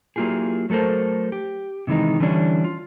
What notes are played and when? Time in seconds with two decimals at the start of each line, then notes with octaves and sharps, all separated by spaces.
0.16 F#3 A#3 E4 F4 G4 G#4
0.70 F#3 A3 A4 A#4 C5
1.32 G4
1.87 C3 D#3 E3 G#3 D#4
2.20 D3 E3 G3 C#4 D4 C#5
2.64 F4